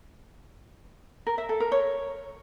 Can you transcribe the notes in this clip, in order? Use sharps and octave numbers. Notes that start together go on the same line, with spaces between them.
A#4
E5
A4
A#4
C#5